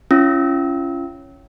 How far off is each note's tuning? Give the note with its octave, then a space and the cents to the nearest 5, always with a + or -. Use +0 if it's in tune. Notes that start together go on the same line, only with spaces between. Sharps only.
C#4 +0 F4 -40 E6 -30